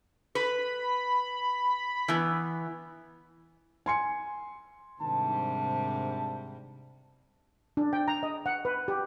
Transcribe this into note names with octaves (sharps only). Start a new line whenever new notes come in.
B4 B5
E3 B3
G#5 C6 C#7
G#2 C3 D#3 G3 D4 A5
D4
G5
A#5
D#5
F#5
B4
G4